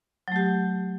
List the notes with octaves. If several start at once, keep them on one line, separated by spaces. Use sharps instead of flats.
F#3 A3 G4